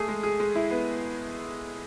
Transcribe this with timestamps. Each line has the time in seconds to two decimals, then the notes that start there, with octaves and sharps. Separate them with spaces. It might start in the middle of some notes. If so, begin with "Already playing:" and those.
Already playing: A3 G#4
0.08 G#3
0.23 G#4
0.40 G#3
0.55 E4
0.71 B3